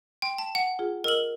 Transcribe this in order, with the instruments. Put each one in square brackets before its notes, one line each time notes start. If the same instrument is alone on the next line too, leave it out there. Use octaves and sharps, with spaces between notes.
[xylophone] G5 [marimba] C6
[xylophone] A5
F#5
[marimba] F4 G#4
[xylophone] A#4 F#7 [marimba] D#5 E6 F6